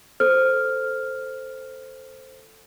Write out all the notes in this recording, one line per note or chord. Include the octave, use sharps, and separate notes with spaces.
A4 C5 F6